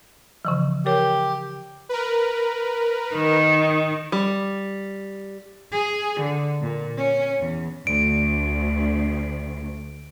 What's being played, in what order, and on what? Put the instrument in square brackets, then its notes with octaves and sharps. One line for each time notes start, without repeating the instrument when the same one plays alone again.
[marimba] C#3 E3 F3
[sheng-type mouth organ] G4 [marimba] A#4 C#5
[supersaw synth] A#4 B4
[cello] D#3
[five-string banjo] G3
[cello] G#4
D3
A#2
C#4
E2
[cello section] D2 [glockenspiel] D7